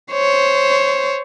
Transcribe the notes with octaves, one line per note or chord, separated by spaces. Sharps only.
C5 C#5